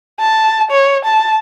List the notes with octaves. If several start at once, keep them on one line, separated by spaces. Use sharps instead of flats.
A5
C#5
A5